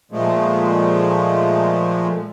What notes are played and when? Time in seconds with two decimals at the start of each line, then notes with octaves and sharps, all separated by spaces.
0.12 A#2 F3 G#3 A3